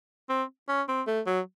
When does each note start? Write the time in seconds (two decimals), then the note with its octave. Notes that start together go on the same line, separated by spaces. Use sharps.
0.29 C4
0.68 C#4
0.88 C4
1.07 A3
1.26 F#3